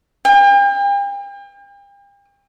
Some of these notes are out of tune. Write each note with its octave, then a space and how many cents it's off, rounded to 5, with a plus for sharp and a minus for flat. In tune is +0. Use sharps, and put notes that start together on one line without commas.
G5 +40